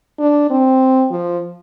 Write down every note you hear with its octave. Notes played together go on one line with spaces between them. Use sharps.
D4
C4
F3